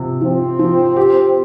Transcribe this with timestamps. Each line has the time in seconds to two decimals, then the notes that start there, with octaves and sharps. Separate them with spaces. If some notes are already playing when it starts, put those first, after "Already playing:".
Already playing: C3 F3
0.21 F3 C4
0.59 F3
0.96 G4